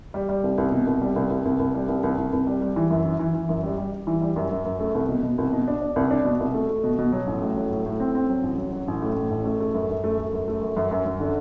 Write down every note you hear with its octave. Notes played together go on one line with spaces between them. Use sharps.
G3
G3
C2
C2
B2
C2
G3
C2
C2
C2
C2
G3
C2
C2
C2
C2
G3
G3
E3
F#2
E3
E3
E3
F#2
G3
G3
G3
E3
G3
F#2
F#2
F#2
A3
C2
B2
B2
C2
B2
D4
D4
C2
D4
B2
C2
A3
A3
B2
B2
F#3
A1
A2
F#3
A2
A2
C4
C4
F#3
A1
F#3
F#3
A1
A2
A2
A1
A3
A3
F#2
F#2
A3
A3
F#2
A3
F#2
F#2
F#2
F#2
D3